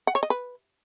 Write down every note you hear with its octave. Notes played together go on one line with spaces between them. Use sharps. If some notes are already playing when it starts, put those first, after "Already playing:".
F#5
C#5
D#5
B4